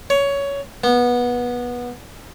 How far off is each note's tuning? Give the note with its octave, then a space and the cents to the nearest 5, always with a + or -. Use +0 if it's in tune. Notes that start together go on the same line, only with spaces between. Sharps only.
C#5 +15
B3 -20